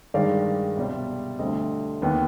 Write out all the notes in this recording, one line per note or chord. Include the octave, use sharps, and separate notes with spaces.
G2 D#3 G#3 D5 F5
C2 B2 G3 C4
D2 D3 G3 C4 D#5
D#2 D#3 B3